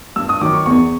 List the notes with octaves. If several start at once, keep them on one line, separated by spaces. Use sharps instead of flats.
G2 E6
D#6
D#3 F#3 D6
C#6
E2 C#6